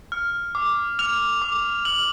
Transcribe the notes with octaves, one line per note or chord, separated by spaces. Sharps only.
F6
D6
F6 F7
D6
F6 F#7